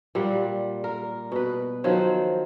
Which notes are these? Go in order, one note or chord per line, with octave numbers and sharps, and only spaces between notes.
A#2 G3 F#5
A#4
B2 B4
D#3 F3 F#3 C5